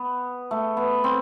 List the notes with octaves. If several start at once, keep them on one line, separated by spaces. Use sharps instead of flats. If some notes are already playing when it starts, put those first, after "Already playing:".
Already playing: B3
A3
B3
C4